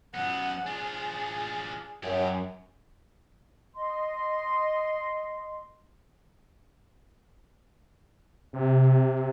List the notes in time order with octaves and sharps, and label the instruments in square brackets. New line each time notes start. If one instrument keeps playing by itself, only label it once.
[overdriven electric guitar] F#2 B3 [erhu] F#5
[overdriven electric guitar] D4 F4 [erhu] G#4
[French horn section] F#2 [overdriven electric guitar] G4 G#4
[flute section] D#5 C6
[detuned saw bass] C3